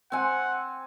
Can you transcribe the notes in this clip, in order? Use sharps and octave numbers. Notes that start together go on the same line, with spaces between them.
C4 F#5 G#5